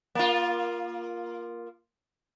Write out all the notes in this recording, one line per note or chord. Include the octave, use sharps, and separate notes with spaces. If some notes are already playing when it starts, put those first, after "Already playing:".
A#3 F4